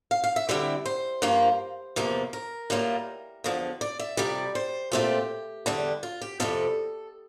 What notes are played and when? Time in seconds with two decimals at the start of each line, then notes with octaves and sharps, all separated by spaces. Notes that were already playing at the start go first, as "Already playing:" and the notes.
0.11 F5
0.24 F5
0.36 E5
0.49 D3 G3 C4 E4 E5
0.85 C5
1.22 G2 F3 A#3 F4
1.96 E2 C3 F3 A#3
2.33 A#4
2.70 A2 G3 A#3 F4
3.44 E2 D3 F3
3.81 D5
3.99 E5
4.17 F2 C3 G3 D5
4.55 C5
4.92 A#2 A3 C4 F4 G4
5.66 E2 D3 G3 D4
6.03 F4
6.21 G4
6.40 F2 C3 G3 A4